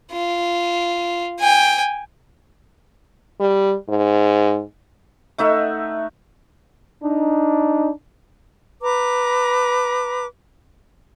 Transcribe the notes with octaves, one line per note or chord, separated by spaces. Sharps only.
F4
G5 G#5
G3
G#2
A3 D#4 E5 F#5
D4 D#4
B4 A#5 D6